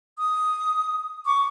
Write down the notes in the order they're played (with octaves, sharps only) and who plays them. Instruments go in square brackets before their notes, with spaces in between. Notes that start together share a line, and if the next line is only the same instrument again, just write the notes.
[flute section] D#6
C#6 D6